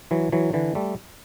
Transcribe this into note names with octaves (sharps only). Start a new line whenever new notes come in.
E3 F#3
E3 F#3
D3 E3
G3 A3